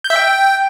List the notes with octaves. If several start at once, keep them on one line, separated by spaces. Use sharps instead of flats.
G6
E5
G5